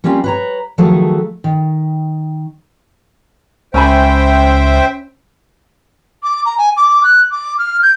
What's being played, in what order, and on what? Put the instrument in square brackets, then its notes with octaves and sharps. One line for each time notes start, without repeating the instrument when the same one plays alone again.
[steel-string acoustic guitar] G3 A#3 C4 C#4 F4
B4 C#5 A#5
D#3 F3 F#3 A3 G#4 A4
D#3
[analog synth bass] C#2 [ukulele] C#4 G#5 B5 [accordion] C5 E5 G5
[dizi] D6
A#5
G#5
D6
F#6
D6
F6
G6